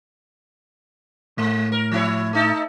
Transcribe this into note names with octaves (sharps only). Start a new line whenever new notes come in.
A2 G#3
A#4
F3 E4 C#5
A3 D#4 A4